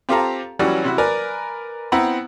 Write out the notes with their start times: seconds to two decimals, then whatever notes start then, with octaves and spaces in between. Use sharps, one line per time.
0.09 C4 F4 G4 A4 F5 A#5
0.59 E3 F#3 G3 C#4 F#4
0.84 C3 E4 F#4
0.98 A#4 B4 D5 G#5 A#5
1.92 B3 C4 E4 F#5 A#5 B5